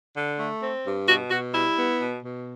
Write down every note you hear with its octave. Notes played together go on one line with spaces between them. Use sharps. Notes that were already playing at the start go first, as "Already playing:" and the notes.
D3
A3
C4
G2
B2 F#4
B2 F#4
G3 E4
B3
B2
B2